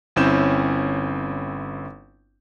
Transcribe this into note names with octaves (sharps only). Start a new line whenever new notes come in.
G1 C4 C#4 E4 G6 E7